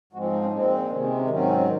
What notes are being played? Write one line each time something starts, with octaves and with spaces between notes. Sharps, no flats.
G#2 F3 G#3 C4 F#4
F4
D#4
C#4
A#2 G#3 C4
C3 D#3 G#3 C#4
C4
C#4
G#2 D#3 F#3 C4 C#4